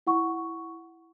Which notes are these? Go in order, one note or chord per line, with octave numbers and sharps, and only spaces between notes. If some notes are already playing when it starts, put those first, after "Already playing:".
E4 F#5 C#6